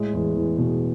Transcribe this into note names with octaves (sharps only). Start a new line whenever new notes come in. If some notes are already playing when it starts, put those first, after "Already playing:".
Already playing: A2 G#3
E2
E2
B2